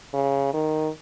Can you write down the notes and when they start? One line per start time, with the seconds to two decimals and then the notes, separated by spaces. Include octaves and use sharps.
0.13 C#3
0.53 D#3